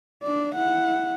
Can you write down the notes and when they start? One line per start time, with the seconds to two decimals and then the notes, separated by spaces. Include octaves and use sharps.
0.23 D4 D5
0.56 E4 F#5